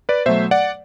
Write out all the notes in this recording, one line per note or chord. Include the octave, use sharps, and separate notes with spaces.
B4 D5
B2 F#3 A3 C5 E5
D5 F#5